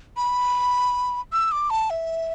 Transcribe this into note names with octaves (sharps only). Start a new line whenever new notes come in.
B5
E6
D6
A5
E5